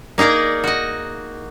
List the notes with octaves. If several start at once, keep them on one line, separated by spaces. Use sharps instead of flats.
A#3 D#4 G#4 A#4 D5
F#4 D#5